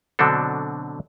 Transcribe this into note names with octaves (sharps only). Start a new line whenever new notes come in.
B2 D3 F#3 C4 D4 A4